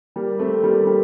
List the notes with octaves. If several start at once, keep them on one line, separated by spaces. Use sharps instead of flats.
G3 A#3
A3 C4
G3 A#3
G3 A#3